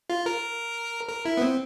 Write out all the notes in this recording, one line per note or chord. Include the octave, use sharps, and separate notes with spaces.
F4
A#4
A#4
E4
B3
C4